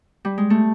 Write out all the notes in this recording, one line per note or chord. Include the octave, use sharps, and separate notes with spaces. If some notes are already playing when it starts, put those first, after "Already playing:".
G3
G#3
A3